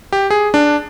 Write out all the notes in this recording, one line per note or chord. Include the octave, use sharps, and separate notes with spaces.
G4
G#4
D4